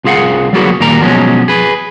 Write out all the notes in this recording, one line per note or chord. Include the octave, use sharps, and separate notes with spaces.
C2 F4 G#4 F5 F#5
F#3 G3 A#3 B3 F#4 G#4
D#2 A#2 G3 A#4 A#5
B2 F3 F#3 G#3 C#4
G#4 B4